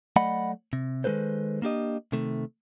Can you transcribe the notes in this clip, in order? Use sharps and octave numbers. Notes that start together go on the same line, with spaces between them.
F#3 A3 D5 D#5 F#5 B5
C3
D#3 G#3 C4 A4 B4 C5
A#3 D4 G4 D#5
C3 D#3 A3